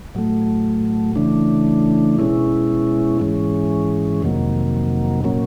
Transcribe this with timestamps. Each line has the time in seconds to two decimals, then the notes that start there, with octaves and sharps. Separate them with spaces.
0.15 A2 F#3 A3
1.16 C#3 E3 A3 D4
2.19 B2 G#3 C#4 E4
3.20 G#2 E3 G#3 C#4
4.23 F2 C3 D#3 F#3 A#3
5.24 A#2 F#3 A#3 C#4